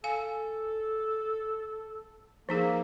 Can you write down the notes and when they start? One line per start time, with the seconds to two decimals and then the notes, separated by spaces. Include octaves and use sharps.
0.04 A4 F5 G#5
2.49 F3 A#3 D#4 G#4